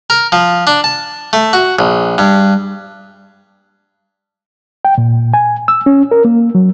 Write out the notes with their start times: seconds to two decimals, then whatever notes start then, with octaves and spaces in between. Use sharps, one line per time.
0.10 A#4
0.32 F3
0.67 D4
0.84 A5
1.33 A3
1.53 F#4
1.79 A#1
2.18 G2
4.85 G5
4.98 A#2
5.34 G#5
5.68 E6
5.86 C#4
6.11 A#4
6.25 A#3
6.55 F#3